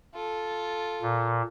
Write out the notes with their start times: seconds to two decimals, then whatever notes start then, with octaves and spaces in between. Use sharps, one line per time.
0.14 F4 A4
1.02 A#2